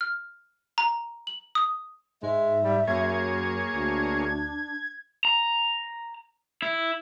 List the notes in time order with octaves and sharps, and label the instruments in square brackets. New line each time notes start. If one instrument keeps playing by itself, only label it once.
[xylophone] F6
A#5
F#7
D#6
[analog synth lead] G#2 [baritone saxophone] G#3 [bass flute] E5
[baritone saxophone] G3
[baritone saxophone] F#2 [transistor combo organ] A#3 G#4 C#5 [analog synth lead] G#6
[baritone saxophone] D2 [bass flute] D4
[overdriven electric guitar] A#5
E4